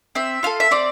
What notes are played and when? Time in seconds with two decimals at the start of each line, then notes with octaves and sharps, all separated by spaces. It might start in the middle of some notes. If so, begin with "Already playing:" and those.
0.15 C4 E5
0.43 F4 A4 F5
0.60 E5
0.71 C4 D5